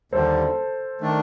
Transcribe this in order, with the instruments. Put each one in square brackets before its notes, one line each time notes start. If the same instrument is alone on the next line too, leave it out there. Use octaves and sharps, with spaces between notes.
[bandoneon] D#2 D3 G3 [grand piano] A4 C5
[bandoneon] D#3 A3 D4